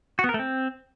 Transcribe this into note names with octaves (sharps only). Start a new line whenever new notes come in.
F#4
B3
A#4
A3
C4